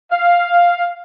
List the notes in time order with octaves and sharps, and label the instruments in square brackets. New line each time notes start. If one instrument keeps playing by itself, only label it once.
[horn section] F5